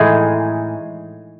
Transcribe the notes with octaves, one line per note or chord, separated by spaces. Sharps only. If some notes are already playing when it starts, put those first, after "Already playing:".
Already playing: A2 E3 G#3 D#4 G#4